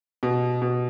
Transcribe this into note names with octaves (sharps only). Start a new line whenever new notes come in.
B2
B2